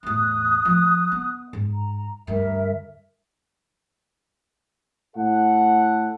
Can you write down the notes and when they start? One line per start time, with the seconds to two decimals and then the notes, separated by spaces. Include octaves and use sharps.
0.03 E2 A2 D#6 F#6
0.65 F3 A3
1.12 B3
1.53 G#2
1.69 A#5
2.27 D2 G2 A#4 E5
5.16 A2 A4 F#5